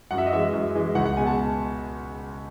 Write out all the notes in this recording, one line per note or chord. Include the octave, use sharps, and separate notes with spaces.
F#2 F#5
E5
D#5
E3 G#3 E5
F#2
E3 G#3
C#2 F#5
F#5
B2 G#3 G#5
A5